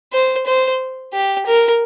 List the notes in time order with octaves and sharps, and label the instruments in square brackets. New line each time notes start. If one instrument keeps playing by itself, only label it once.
[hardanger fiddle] C5
C5
G4
A#4